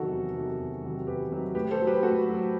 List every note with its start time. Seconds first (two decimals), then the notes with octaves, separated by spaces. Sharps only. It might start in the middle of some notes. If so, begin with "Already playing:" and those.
Already playing: E2 C3 D#3 F#3 F#4 A4
0.11 E2
0.35 C3 D#3 F#3
0.59 E2
0.83 C3 D#3 F#3
1.07 E2 G4 B4
1.30 C3 D#3 F#3
1.55 A2 G4 B4
1.71 A4 C5
1.79 F#3
1.87 G4 B4
2.03 A2 F#4 A4
2.27 F#3